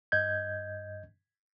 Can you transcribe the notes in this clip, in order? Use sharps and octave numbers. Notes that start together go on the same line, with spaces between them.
G2 D#5 G6 G#6